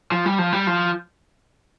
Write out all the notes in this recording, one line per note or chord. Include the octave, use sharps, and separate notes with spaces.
F3
G3
F3
G3
F3